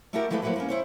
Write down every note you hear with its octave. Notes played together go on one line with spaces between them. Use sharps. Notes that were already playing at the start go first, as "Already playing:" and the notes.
A3 D4 E4 F#4 G4 A#4
E3 F3 G#3 A3 G4 B4
F3 F#3 A#3 E4 F#4 B4
A#3 C4 C#4
E4 C5 C#5